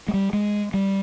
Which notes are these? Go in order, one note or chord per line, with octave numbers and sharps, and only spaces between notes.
G#3
G3
G#3
G3